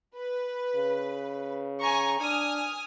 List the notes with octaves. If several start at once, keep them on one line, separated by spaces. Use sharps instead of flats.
B4
C#3
G#5 A#5 C#6
D4 G#5 D#6 F6